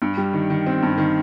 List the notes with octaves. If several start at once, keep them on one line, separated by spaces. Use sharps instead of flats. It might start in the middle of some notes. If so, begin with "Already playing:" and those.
G2
G3
D#3
D#3
C4
G2
D#3